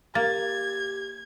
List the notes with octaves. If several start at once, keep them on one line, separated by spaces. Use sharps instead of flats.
A#3 G4 G#6 A6